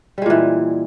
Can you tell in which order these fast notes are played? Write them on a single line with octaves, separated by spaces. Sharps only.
G3 G#3 A#2 E3